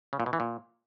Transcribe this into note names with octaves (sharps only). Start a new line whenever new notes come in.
C#3
A#2
B2
E3
A#2